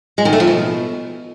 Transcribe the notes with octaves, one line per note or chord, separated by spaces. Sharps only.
G#3
D#3
A3
F3
B2